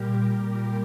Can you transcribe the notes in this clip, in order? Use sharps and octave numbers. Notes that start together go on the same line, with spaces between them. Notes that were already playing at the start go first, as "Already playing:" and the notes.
Already playing: A#2 G3 A#3 G4 A#4
A#2 G3 A#3